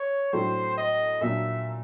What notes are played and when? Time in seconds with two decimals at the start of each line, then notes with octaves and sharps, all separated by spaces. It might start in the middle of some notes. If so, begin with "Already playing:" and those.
Already playing: C#5
0.33 A2 F#3 A3 D4 C5
0.78 D#5
1.21 A#2 F#3 A#3 D4 E5